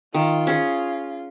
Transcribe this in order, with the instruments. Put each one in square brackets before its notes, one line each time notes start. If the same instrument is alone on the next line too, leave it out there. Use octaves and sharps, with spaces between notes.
[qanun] D#3 [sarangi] F4
[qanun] C#4 G#4